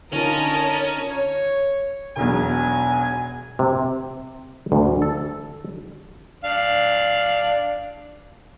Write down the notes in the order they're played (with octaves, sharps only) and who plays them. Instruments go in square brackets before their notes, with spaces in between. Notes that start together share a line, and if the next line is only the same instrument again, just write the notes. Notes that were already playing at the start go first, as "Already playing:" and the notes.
[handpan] D3 D#4 F4 [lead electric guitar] C#4 [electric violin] A#4 [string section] A5 A#5 D#6
[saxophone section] C#5
[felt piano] E1 B1 E2 [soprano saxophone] G#5
[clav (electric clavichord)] C3
D2
A4
[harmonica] D4 F5